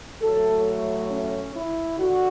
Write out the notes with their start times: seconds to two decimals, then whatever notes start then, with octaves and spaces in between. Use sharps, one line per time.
0.21 A2 F#3 A3 A4
1.10 C#4
1.55 E4
1.99 D3 F#4